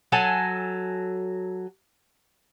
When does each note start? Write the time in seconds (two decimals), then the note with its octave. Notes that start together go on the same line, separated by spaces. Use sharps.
0.12 F#3 A4 G#5 A5